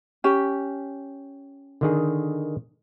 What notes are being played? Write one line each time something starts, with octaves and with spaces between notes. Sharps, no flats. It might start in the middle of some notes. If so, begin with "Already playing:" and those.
C#4 G4
D3 D#3 G#4